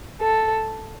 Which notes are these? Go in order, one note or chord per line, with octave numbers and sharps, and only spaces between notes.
A4